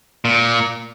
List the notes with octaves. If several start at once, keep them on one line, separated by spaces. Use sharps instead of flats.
A#2